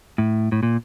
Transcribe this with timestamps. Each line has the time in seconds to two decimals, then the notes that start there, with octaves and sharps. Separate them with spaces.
0.18 A2
0.52 A2
0.63 A#2